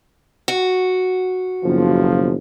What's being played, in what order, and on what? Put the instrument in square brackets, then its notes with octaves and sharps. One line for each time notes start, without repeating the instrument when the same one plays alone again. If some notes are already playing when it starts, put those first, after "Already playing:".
[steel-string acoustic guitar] F#4
[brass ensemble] F#1 B1 F3